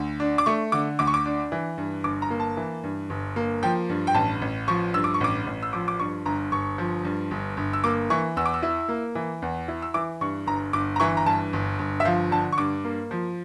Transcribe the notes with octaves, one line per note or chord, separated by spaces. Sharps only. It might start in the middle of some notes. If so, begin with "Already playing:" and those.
Already playing: D2
D4
D6
A3 C#6
D3 D6
D2 D6
C#6
D6
D4
E3
G2
G1 D6
A#5
A#3
A5
E3
G2
G1
A#3
F3 G5
G2
G5
A1 A5
A1
F3 C#6
G2 E6
D6
C#6
A1 D6
A1
E6
F3 D6
D6
G2 C#6
G1 A#5
G1 C#6
F3
G2
G1
G1
E6
A#3 D6
E3 C#6
E2 E6
D6
E6
E4
A#3
E3
E2
E4
E6
E3 D6
G2 C#6
G1 A#5
G1 D6
A#5
E3 C#6
A#5
G2 A5
G1
G1
E5
F3 F5
D3 A5
C#6
G2 D6
A#3
F3